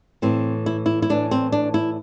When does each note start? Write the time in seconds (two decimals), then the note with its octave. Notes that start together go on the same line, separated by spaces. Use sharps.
0.22 A2 E3 C4
0.66 E4
0.86 E4
1.02 E4
1.10 A2 E3 D4
1.31 C4
1.52 D4
1.74 E4